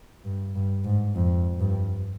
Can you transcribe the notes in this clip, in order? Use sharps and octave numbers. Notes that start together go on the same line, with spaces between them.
G2
G2
G#2
F2
G2